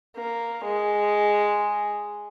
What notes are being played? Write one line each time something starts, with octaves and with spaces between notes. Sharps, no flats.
A#3
G#3